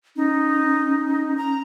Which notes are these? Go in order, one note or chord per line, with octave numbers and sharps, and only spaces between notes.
C#4 D#4
A#5